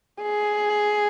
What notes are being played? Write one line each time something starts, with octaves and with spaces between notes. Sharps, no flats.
G#4